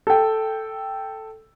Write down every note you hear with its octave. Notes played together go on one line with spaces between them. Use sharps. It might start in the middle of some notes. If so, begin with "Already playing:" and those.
A4 G5